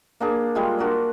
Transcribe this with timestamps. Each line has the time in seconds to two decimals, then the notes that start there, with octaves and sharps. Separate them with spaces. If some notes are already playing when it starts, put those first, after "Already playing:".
0.20 A#3 D4 G#4
0.55 G3 G#3 F4
0.78 D4 F#4 A#4 D5